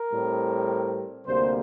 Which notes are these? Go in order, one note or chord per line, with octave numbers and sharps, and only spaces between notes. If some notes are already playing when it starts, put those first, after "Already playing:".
Already playing: A#4
A2 G3 C4
D2 C3 G3 A#3 C5